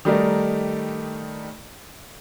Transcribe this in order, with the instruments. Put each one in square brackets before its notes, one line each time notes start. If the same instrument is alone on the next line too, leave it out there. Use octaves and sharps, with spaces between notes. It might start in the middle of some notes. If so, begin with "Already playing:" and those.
[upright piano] D#3 G3 A3 D#4 A#4 D5